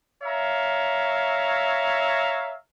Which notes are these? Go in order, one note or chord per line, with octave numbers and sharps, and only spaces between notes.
C#5 E5 F5 A#5